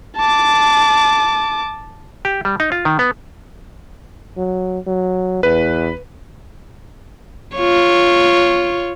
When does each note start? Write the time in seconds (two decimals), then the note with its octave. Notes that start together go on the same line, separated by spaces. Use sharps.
0.17 A5 D6
2.25 G4
2.45 G3
2.60 D#4
2.72 F4
2.85 D#3
2.99 B3
4.37 F#3
4.87 F#3
5.43 E2 B4
7.56 F4 C#5